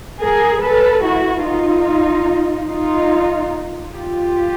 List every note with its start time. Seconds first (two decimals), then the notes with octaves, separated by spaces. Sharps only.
0.21 G#4 A#4
0.63 A4 B4
1.04 E4 F#4
1.45 D#4 F4
2.69 D#4 F4
3.94 F4 G4